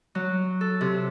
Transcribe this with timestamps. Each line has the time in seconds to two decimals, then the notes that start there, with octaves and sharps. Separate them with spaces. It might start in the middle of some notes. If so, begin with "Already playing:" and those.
0.15 F#3
0.61 A4
0.81 C3